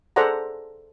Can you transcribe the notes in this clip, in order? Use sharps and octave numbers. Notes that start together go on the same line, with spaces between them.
G#4 A4 C5 D5 F#5 A#5